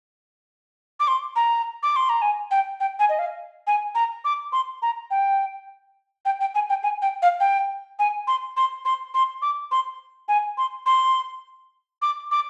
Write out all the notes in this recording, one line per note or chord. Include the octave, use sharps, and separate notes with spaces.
D6
C6
A#5
D6
C6
A#5
G#5
G5
G5
G#5
D#5
F5
G#5
A#5
D6
C6
A#5
G5
G5
G5
G#5
G5
G#5
G5
F5
G5
G#5
C6
C6
C6
C6
D6
C6
G#5
C6
C6
D6
D6